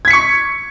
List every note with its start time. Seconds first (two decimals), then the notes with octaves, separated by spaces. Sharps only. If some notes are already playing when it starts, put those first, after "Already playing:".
0.05 G#6
0.08 B6
0.10 C#7
0.13 C#6